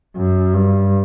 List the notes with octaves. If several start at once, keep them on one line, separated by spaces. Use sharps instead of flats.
F#2
G2